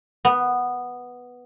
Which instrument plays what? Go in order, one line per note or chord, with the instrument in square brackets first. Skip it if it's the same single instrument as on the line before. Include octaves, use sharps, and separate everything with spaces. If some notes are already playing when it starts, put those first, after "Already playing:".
[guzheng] B3